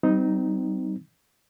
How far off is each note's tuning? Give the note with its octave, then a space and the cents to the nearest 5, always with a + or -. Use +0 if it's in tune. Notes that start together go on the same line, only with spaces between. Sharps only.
G3 -35 C4 -30 D#4 +0